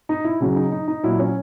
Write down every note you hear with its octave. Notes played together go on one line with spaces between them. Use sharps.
D#4
E4
C#3 F#3
D#4
D#4
D#4
A#2 F#3 E4
C#4